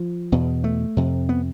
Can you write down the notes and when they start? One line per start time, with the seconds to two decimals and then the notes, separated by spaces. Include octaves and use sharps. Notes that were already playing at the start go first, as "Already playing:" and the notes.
Already playing: F3
0.32 E2 B2
0.64 A3
0.97 F2 C3
1.29 B3